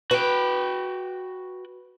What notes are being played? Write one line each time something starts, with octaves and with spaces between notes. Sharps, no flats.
F#4 B4 G5